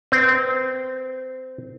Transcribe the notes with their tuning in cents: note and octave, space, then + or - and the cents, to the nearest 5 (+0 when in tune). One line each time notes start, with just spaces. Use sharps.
C4 -20 B4 +0